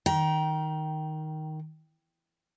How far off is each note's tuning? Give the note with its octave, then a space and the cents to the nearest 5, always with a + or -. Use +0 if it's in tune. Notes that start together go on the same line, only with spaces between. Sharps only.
D#3 +0 G5 -15 A#5 +25